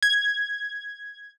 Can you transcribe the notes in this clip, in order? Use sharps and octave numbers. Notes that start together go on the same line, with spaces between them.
G#6